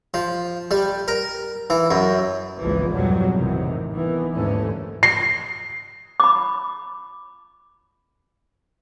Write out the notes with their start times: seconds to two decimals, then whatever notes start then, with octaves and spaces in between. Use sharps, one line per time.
0.14 F3
0.71 G3
1.08 A#4
1.70 E3
1.91 F#2
2.61 G#1 C#2 E3 F3 G#3 A#3
2.92 F2 G#2 B2 F#3 G3
3.36 A1 G#2 C3 D#3 E3
3.93 D#3 E3 B3
4.33 D#2 G#2 D3 E3 A3 C#4
5.03 C7
6.20 B5 D6